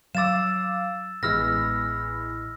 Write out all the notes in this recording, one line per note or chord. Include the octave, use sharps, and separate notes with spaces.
F#3 F5 D6 E6 A6 E7
A1 E3 G#3 B3 E6 F6 A#6